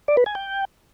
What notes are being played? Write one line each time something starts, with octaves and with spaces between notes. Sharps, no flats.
D5
B4
G#5
G5